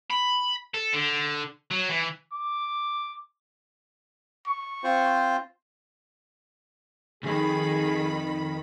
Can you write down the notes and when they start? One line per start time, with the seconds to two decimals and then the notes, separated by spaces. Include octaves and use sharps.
0.10 B5
0.74 A4
0.94 D3
1.71 F#3
1.89 E3
2.34 D6
4.47 C#6
4.84 C4 F4 C5
7.23 B1 F2 D#3 G#4 B5